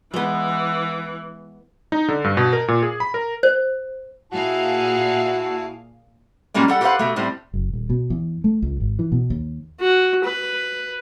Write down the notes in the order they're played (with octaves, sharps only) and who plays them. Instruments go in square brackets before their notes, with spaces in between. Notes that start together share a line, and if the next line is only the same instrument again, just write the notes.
[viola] E3 [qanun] G#3 B3
[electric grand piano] D#4
D3
G2
B2
A#4
A#2
G#4
B5
A#4
[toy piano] C5
[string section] A#2 G#4 F5 [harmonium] E4 A5 [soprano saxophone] F#4
[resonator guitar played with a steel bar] A#2 G3 G#3 A#3 C#4 D5
G3 A4 F#5
G4 A4 B4 C5 F5 F#5
B2 A3
A2 G3 C4
[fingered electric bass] F#1
D#1
B2
E2
A3
C#2
G#1
E3
B2
D#2
[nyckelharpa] F#4
B4